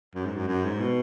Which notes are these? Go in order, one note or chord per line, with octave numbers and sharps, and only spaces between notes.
F#2
G#2
F#2
F#2
G#2
B2